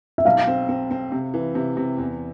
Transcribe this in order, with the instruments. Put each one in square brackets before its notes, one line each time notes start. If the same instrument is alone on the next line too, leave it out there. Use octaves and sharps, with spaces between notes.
[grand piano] E5
[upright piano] B1 [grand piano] F5
[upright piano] C4
C4
C4
C3
E3
C3
C3
E2